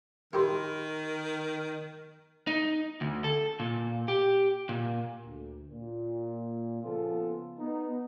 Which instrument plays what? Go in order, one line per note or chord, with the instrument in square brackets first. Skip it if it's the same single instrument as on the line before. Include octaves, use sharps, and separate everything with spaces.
[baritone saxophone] D#3 [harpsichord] E4 G4 C5 [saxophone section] A#4
[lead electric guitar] D#4
D2
A4
A#2
G4
A#2
[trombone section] D2
A#2
C#3 F3 B3 F4 G#4 A4
B3 D#4